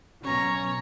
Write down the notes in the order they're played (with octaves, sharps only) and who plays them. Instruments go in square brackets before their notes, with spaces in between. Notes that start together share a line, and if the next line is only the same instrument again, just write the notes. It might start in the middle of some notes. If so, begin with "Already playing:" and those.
[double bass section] B2 F#3 [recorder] C#4 [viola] C#5 A#5